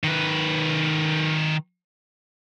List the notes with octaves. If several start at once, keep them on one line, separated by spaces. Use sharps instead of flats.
D#3 B4